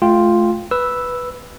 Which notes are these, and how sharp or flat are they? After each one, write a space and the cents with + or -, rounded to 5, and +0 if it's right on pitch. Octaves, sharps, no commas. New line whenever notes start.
A3 -30 F4 +0 G5 +0
B4 +0 E6 +0